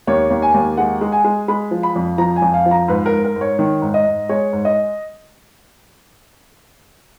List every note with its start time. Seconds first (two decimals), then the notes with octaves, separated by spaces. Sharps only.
0.07 D#2 C#5
0.30 D#2
0.42 G#5
0.54 D#2
0.77 G#3 F#5
1.01 G#3
1.12 G#5
1.25 G#3
1.48 G#3 B5
1.71 F3
1.83 B5
1.96 F2
2.18 F3 A#5
2.36 G#5
2.42 F2
2.54 F5
2.66 F3
2.71 A#5
2.88 G#2 B4
3.06 A#4
3.12 G#2
3.24 A#4
3.36 G#2
3.41 C#5
3.59 D#3 C#5
3.82 G#2
3.94 D#5
4.06 G#2
4.29 G#3 C#5
4.53 G#2
4.65 D#5